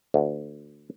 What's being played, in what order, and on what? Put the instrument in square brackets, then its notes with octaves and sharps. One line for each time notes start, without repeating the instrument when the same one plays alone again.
[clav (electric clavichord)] D2